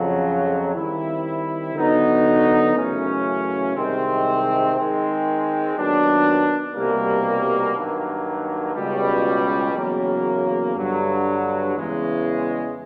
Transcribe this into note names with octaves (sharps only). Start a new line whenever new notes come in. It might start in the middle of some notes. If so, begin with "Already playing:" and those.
Already playing: F2 C#3 F#3
D#3 G3 C4 E4
D3 F#3 B3 D#4 F#4
F#2 C#3 E3 A3 C#4
C2 C3 D#3 G#3 C4
D#3 G#3 C4
D#2 D#3 F#3 B3 D4
C2 B2 G3 A#3
G2 D#3 F#3 A#3
C#2 B2 G3
E2 C#3 F#3 A#3
G2 D3 F#3
E2 C#3 E3 G#3